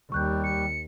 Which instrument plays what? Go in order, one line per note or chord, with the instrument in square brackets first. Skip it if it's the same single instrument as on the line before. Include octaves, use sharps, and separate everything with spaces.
[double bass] D#2 [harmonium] G3 [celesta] C#6 F#6 G6
[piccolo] C#7